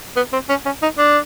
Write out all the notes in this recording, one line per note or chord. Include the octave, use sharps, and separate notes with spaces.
B3
C4
C#4
C#4
D#4
D4